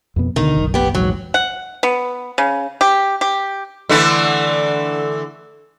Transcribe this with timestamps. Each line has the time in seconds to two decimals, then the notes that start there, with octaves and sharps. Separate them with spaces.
0.16 F2 B2 B3
0.36 D2 B2 D3 D#3 D#4
0.57 F#1 B1
0.74 B3 G4
0.95 A#1 E2 G#2 F#3
1.34 F#5
1.83 B3
2.38 C#3
2.81 G4
3.21 G4
3.89 D3 E3 A3